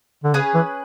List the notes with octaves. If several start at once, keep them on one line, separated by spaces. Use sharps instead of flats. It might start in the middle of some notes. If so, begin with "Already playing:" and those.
D3
C#3 C#4 G#4 B4
E3